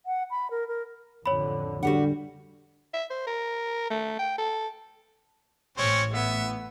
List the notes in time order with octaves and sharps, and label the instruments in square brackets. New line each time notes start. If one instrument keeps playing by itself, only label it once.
[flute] F#5
B5
A#4
A#4
[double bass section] A1 F2 D3 [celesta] C#5 B5
[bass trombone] D3 [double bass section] G3 [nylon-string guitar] F#4 G4 F#5
[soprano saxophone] E5
C5
A#4
A3
G5
A4
[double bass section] A1 A2 [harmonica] C4 C#4 [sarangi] C#5
[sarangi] B3 [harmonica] E5